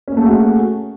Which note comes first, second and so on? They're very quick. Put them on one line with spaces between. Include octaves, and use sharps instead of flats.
C#4 A#3 A3 G#4 F#4